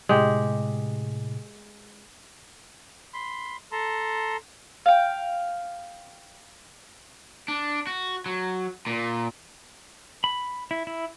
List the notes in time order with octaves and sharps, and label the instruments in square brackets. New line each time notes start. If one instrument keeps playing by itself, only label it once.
[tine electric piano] A2 C3 [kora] G#3 G4
[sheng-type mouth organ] B5 C6
A4 A5 A#5 C6
[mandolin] F5 G5
[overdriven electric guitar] D4
F#4
F#3
A#2
[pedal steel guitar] B5
E4
E4